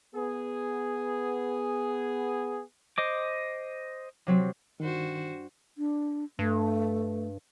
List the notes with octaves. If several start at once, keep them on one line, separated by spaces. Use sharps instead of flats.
B3 G#4
C5 D#5 D6
C3 F#3 C4
G2 D#3 F#4 C5
D4
G2 A3